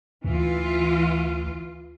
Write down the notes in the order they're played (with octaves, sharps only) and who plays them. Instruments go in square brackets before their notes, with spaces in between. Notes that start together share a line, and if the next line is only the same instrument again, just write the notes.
[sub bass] D2 [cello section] E3 F4